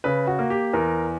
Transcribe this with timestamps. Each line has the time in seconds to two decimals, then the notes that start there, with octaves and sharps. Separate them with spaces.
0.04 C#3 B4
0.27 F#4
0.39 A#3
0.50 G4
0.73 E2 A#4